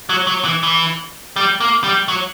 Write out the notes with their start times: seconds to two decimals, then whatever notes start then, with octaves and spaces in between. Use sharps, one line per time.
0.09 F#3
0.27 F#3
0.44 E3
0.63 E3
1.36 G3
1.60 A#3
1.84 G3
2.08 F#3